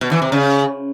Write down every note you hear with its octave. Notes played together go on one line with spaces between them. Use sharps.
B2
E3
C3
C#3